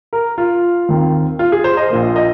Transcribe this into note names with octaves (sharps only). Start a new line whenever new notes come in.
A#4
F4
D#2 D#3 C4
F4
G#4
C5
D#5
A#1 A#2 A#3
D#5